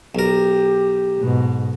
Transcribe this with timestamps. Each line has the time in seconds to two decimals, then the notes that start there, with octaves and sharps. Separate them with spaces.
0.15 B1 G4 A#4
1.19 G#2 B2